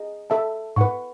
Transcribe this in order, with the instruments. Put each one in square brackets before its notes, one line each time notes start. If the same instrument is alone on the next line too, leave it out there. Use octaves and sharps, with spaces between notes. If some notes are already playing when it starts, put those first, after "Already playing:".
Already playing: [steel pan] G#4 D#5
A4 E5 A5
[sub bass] G#2 [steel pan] B4 F#5 C#6